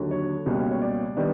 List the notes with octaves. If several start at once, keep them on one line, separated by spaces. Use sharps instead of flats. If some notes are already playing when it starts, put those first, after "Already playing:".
Already playing: D#2 D3 F#3
C#5
C#2 B2 G3 A#3
C#5
D5
D#3 G3 B3 D4